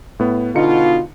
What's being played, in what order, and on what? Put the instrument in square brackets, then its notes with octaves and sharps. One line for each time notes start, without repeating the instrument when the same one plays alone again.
[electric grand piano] A2 B3
[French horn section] B2 F4 [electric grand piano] D3 D#4 C#7